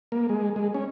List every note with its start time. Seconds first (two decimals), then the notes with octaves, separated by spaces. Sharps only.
0.12 A#3
0.29 G#3
0.56 G#3
0.74 C#4